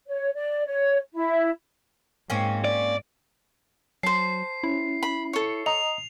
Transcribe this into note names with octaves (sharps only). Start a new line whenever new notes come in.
C#5
D5
C#5
E4
G#2 A#3 C4 C#4
D5
F#3 C5 A5 C7
C#4 E4
B5
A4 C#5
D#5 A#5 D#6 F7